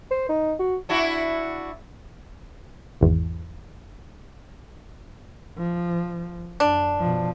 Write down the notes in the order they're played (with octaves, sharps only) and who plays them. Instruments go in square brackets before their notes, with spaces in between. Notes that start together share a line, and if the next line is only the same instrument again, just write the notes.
[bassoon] C5
D#4
F#4
[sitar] D4 E4 F#4
[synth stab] G#1 E2
[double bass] F3
[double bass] F#2 [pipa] D4
[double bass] B2 F3